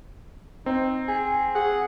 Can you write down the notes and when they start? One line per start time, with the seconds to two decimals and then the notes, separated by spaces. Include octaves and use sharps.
0.66 C4 D#4
1.08 G#4
1.55 G#4 F#5